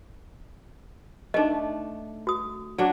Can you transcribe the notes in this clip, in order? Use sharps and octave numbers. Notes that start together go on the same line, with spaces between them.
A3 D4 D#4 D#5
F#4 D#6
F#3 D4